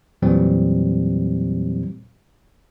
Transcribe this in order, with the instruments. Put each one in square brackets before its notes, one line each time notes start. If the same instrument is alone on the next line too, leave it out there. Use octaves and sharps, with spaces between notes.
[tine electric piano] E2 A#2 E3 F#3 G3 C4